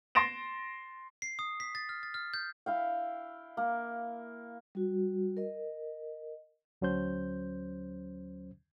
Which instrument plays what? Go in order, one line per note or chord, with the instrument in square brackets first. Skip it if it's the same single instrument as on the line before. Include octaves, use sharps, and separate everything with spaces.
[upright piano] C6 A6 A#6 D7 E7
[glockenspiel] C7
D#6
B6
A6
F6
A6
F6
G6
[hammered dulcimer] E4 F5 G5
A#3
[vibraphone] G3 F#4
A#4 D#5
[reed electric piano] D2 F#3 C#4 C5 G6